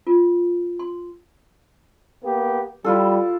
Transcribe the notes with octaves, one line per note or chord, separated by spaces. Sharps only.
F4
C6
A#3 B3 G4
G3 E4 F4 A4